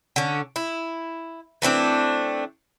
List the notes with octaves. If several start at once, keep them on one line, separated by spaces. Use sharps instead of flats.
D3 C#4
E4
E3 A3 C4 D4